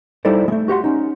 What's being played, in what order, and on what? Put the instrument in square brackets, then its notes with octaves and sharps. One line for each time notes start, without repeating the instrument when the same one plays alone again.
[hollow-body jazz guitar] G3 D#4 E4 A4 C5 D5
G#3 A3
F#4 G4 F#5 C6
C#4 D#4